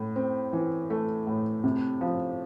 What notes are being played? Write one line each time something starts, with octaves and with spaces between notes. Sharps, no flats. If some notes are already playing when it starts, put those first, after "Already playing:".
Already playing: A2
C4
E3
A3
A2
C3
F3